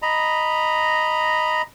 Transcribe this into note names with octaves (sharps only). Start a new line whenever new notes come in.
D#5 A#5 B5